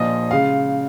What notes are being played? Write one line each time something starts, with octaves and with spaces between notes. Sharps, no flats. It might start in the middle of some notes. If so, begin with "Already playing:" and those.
Already playing: A#1 A#2 F3 D#5
C#3 G#3 F5